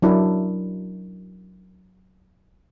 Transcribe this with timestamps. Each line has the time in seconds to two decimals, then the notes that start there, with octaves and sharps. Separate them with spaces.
0.02 F#3 D4 E4 A#4